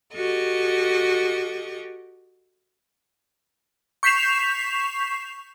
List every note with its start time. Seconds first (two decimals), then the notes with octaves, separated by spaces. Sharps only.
0.14 F#4 G4 A4 D#5 C#6
4.03 C#6 G6 B6 C7 E7 F7